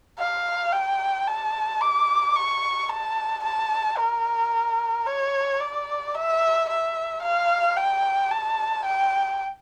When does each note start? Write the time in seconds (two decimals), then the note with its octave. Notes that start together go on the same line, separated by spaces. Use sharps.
0.19 F5
0.72 G5
1.27 A5
1.81 D6
2.36 C#6
2.89 A5
3.43 A5
3.98 A#4
5.07 C#5
5.60 D5
6.15 E5
6.69 E5
7.23 F5
7.77 G5
8.31 A5
8.85 G5